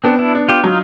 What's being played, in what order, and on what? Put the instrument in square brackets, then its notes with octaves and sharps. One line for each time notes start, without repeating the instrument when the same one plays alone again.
[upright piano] B3 [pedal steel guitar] C4 D4
[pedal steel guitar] D4 E4
[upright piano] D4
[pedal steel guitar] F4 G4
[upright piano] F#3 [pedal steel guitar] D#4 F4